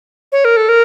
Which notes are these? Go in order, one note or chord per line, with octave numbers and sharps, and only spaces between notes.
C#5
A#4
A4
A#4